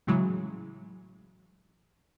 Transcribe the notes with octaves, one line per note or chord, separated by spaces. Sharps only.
A2 C#3 E3 F#3 G#3